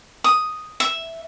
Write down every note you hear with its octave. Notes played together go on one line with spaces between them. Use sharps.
D#6
E5